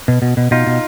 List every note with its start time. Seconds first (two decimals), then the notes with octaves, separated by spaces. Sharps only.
0.08 B2
0.22 B2
0.37 B2
0.51 B2 D#4 F4
0.67 B2